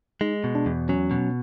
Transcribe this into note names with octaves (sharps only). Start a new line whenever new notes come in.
G#3 D#4
B2
D4
E2
F#3 C#4
B2